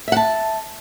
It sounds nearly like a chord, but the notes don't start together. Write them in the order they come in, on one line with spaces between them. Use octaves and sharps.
E5 F#5 A5